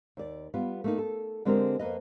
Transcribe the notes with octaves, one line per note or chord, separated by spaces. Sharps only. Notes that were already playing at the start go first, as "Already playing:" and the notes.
D#2 D5
G3 B3 F4 B4
A3 A#3 D#4
A4
D3 G#3 C4 D4 G4 A#4
F2 A#3 B4 D#5